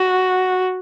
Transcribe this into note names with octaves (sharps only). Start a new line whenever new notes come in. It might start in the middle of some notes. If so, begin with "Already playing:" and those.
Already playing: F#4